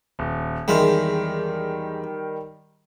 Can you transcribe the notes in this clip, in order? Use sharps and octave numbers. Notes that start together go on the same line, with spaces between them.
D#1
E2 D#3 G3 G#3 E5